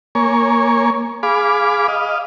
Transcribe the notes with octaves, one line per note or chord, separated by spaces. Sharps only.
A#3 C#5 G#5
G#4 F5 B5 D6
D#5 F5